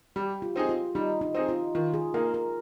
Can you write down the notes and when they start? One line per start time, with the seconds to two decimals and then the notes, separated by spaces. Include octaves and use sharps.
0.16 G3 G4
0.42 F4
0.56 C4 D#4 G#4
0.69 F4
0.95 G3 D#4
1.21 D#4
1.35 C4 D#4 G#4
1.49 F4
1.75 D#3 F4
1.94 G#4
2.14 A#3 D#4 G#4 A#4
2.34 A#4